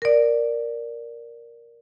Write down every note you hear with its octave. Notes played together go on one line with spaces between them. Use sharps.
A#4 D5